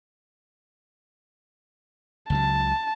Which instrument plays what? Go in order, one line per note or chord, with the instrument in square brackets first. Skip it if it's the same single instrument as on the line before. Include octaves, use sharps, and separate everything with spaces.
[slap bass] C#2 C#3 F#3 [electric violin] A5